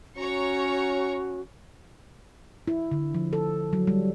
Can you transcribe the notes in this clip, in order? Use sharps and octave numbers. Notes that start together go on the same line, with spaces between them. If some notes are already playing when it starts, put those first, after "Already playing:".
C#4 F#4 C#5 A#5 C#6
E4
D3
F3
A4
F#3
G3